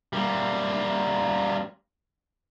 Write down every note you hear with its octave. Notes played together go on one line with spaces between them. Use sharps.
G3 A#3